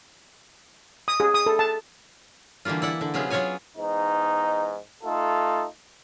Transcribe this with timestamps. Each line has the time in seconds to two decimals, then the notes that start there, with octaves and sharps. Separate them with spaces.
1.08 D#6
1.20 G#4
1.34 D#6
1.46 A4
1.59 A5
2.65 D3 E3 G3 A#3 F4
2.82 E4 D5 F#5
3.01 D3
3.14 C3 F#3 B3 C#4 F4 G#4
3.30 F#3 B3 F4 F#4 C#5 G#5
3.77 E2 G#2 D#4
5.03 A3 D#4 F4 A4